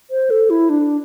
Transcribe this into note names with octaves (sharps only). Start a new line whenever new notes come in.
C5
A4
E4
D4